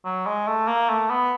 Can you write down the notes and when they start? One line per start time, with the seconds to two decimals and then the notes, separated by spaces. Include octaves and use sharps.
0.05 F#3
0.26 G#3
0.47 A3
0.68 A#3
0.89 A3
1.10 B3